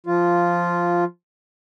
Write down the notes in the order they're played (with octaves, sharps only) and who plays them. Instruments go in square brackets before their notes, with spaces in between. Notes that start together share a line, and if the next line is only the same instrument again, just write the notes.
[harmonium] F3 F4